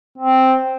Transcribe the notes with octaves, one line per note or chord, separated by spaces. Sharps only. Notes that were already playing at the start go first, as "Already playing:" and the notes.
C4